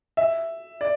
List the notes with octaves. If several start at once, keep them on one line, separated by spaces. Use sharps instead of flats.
E5
D5